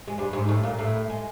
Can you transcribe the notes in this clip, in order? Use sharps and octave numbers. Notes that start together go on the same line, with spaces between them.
G#3
G2 G3
G#2 G#3
A2 A3
A#2 A#3
A2 A3
G#3